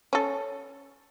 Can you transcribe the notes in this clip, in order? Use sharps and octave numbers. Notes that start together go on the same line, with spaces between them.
C#4 A4